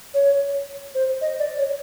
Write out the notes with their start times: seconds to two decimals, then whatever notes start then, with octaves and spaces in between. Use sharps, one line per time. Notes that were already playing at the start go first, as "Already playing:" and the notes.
0.14 C#5
0.95 C5
1.21 D#5
1.39 D5
1.58 C#5